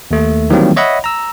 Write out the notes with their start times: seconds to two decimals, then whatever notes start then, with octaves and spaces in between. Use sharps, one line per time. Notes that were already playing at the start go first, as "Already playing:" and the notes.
0.11 D#2 A3
0.50 D#3 E3 F#3 G3 A#3 C4
0.76 C#5 D#5 E5 F#5 B5
1.04 A#5 E6